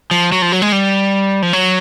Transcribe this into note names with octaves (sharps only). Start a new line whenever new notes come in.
F3
F#3
F3
F#3
G#3
G3
F3
F#3